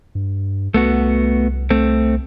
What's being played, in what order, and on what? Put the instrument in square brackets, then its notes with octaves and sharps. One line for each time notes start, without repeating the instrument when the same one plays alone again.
[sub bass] G2
[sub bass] C2 [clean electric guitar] A3 B3 F#4
[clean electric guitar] A3 C4